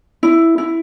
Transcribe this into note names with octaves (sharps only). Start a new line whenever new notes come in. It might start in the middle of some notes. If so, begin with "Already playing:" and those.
E4
E4